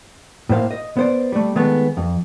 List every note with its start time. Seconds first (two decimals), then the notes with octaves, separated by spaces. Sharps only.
0.49 A2 A#3 C5 F5
0.71 D#5
0.97 B3 C5 D5
1.32 G3 A3
1.56 D#3 G#3 A3 B3
1.97 F2